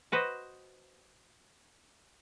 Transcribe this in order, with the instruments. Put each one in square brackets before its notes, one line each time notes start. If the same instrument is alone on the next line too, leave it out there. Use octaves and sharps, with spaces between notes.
[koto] F#4 B4 C5 D#5